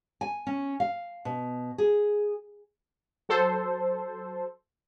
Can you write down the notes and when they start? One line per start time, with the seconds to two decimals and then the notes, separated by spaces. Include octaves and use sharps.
0.21 G#5
0.47 C#4
0.80 F5
1.25 B2
1.78 G#4
3.29 F#3 A4 C5